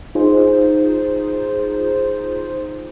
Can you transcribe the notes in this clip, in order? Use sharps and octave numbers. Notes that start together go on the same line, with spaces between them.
D#4 F4 G#4 C5